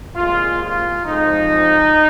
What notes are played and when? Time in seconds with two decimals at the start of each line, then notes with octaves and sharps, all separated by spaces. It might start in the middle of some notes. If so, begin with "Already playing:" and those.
0.15 C2 A#2 G#3 F4
0.60 F4
1.05 F2 F3 G#3 D#4